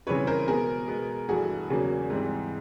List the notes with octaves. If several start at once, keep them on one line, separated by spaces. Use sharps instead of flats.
C#3 E3 G3 C4 B4 C#5
A#4 C5
B2 G#3 B3 G#4 A#4
B2 G#3 B3
G2 E3 A3 F#4 G#4
E2 C#3 F#3 A#3
G#2 E3 G3 C4